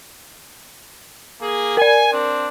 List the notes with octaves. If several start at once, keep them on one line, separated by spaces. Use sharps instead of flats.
A#3 G#4
A#4 D5 G#5
C4 D4